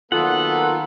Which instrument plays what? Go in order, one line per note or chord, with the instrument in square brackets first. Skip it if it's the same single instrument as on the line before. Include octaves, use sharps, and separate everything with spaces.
[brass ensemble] D#3 F#3 A#3 [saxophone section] B3 A4 [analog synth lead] F4 [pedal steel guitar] F#5